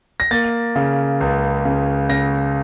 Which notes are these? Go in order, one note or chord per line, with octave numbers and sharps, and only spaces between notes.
A#6
A#3 A6
C#3
C#2
C#3
C#3 A#6